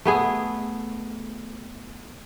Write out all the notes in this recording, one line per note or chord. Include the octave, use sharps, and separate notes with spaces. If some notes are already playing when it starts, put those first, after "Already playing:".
A3 B3 G#4